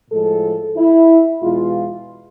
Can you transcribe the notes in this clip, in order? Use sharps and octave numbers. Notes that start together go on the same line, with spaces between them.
A2 F3 G#3 A4
E4
E2 B2 G#3 F4